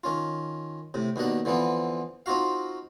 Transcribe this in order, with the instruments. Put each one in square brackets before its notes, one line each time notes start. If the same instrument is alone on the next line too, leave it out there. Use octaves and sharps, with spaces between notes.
[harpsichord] D#3 C#4 F4
A2 C3
D#2 B2 D#3 D4 F#5
D3 E3 F3 B3 C4
C4 D#4 F4 F#4 F5